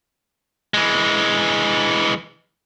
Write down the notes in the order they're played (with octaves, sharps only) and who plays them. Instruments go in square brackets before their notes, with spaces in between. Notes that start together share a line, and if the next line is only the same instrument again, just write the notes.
[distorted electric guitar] E3 G#3